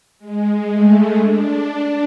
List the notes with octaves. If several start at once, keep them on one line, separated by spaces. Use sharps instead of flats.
G#3
A3
D4
D4